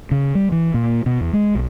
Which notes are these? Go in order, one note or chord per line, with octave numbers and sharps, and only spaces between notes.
C#3
G3
E3
A#2
B2
E2
G#3
B1